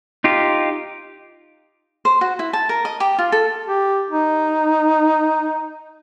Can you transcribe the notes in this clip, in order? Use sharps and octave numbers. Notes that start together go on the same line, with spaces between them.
D#4 F4 G4
C5
F#4
E4
A5
A#4
D#5
G4
F4
A4
G4
D#4